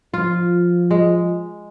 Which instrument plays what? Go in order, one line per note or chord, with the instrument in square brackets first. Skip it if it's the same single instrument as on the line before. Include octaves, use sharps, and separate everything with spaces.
[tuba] F3 [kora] F4
[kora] G#3